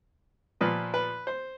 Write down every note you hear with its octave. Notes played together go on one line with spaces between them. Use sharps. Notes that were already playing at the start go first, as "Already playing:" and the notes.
A#2 F3 B4
B4
C5